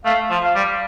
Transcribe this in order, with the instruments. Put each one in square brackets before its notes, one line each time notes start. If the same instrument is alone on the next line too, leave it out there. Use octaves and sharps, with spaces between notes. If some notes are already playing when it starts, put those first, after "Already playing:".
[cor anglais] A3 [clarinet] F5
[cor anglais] F3
[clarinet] F5
[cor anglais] G3